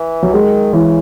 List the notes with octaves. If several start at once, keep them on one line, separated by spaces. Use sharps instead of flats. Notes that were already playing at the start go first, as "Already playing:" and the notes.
Already playing: E3
F#3
D#3 G#3
C#3 E3